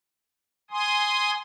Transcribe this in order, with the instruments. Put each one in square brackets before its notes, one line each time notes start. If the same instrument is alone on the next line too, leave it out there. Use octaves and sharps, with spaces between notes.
[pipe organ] G#5 C6 D#6